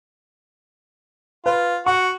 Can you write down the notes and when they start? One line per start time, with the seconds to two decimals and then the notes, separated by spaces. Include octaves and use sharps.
1.46 F4 B4
1.86 F#4 C#6